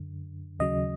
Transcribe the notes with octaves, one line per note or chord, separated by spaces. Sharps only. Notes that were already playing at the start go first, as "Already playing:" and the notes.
Already playing: F#2 D3
D#2 C#3 F#3 D#5